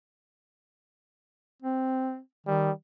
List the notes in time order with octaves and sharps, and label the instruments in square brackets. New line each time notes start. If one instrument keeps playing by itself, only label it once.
[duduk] C4
[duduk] D#3 [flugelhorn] G3